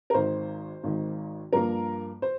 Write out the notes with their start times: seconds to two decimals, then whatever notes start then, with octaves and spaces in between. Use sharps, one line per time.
0.10 A#4
0.14 G#1 G#2 D#3 C5
0.84 G#1 G#2 D#3
1.53 G2 F3 A#3 A#4
2.22 C5